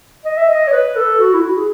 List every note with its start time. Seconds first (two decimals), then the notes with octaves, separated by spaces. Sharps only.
0.25 D#5
0.37 E5
0.49 D#5
0.68 C#5
0.72 B4
0.96 A4
1.20 F#4
1.34 E4
1.43 F#4
1.57 G#4